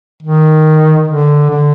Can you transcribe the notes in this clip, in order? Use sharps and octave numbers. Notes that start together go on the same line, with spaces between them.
D#3
D3
D3